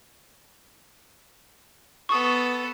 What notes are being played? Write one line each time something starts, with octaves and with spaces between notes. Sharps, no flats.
B3 A4 C#6 D#6